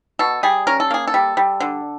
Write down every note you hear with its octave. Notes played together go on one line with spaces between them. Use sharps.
B2 A4
G3 G#4
C#4 A#4
A4
A#3 G#4
A4
G3
G3
D3